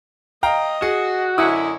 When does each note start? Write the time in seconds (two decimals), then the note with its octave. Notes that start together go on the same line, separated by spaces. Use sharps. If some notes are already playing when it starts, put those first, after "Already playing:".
0.43 D#5 F5 G5 A#5
0.82 F#4 G#4
1.38 F#2 D3 E4 C#5 D#5 D#6 C#7